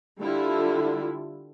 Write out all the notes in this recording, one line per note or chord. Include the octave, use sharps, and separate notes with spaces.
D3 G3 E4 F4